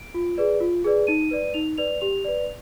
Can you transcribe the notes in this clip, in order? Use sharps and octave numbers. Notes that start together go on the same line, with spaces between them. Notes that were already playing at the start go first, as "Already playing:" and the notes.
Already playing: D7
F4
G#4 B4 D5
F4
G#4 B4 D5
D#4 D#7
B4 D5
D#4 F7
B4 D5 F7
G4 F7
B4 D5